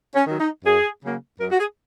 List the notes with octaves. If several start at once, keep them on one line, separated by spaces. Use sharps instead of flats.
C#4
D#3 F#3
D#4
F#2 G#4
C#3 F#3 A#3
F#2 A#4
F#4
G#4